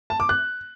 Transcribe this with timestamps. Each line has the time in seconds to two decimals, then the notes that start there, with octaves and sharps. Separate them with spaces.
0.10 A5
0.20 D6
0.29 F#6